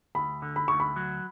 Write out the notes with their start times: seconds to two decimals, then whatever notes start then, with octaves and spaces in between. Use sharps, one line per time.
0.15 D2 B5
0.42 D3
0.56 B5
0.68 D2 C#6
0.80 B5
0.96 F#3